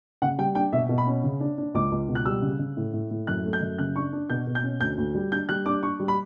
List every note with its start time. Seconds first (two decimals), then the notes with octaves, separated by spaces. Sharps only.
0.22 C#3 F#5
0.38 G3 G5
0.55 D4 G5
0.73 B2 E5
0.89 B2
0.98 B5
1.07 C#4
1.24 C#3
1.40 D4
1.58 D4
1.74 C#2 D6
1.92 C#2
2.09 B2
2.15 F#6
2.26 G3 E6
2.42 C#3
2.59 C#3
2.77 A2
2.93 A2
3.11 A2
3.27 F#2 F#6
3.45 A3
3.53 G6
3.62 F#2
3.78 C#3 F#6
3.96 D4 C#6
4.13 D4
4.30 B2 G6
4.47 B2
4.55 G6
4.64 C#4
4.80 D2 G6
4.98 D2
5.15 G3
5.32 D4 G6
5.49 G3 F#6
5.66 D4 D6
5.83 D4 C#6
6.00 G3
6.08 B5